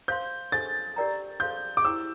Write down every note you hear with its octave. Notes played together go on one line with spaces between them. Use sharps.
C5 F5 C6 G6
D4 A4 C5 A6
G4 A#4 D5 G5 A#5
A4 C5 F5 C6 G6
D6
E4 G4 C5 G5 E6